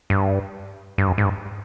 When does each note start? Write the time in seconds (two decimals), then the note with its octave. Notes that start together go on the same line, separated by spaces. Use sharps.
0.10 G2
0.98 G2
1.08 F#2
1.18 G#2
1.24 G2